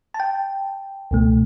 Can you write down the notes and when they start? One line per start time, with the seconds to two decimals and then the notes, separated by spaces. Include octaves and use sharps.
0.14 A5
0.20 G5
1.11 C#2 B2 A3